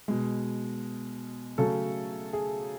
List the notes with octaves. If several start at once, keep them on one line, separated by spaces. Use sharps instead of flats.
B2 G#3
C#3 F#3 A3 A4
G#4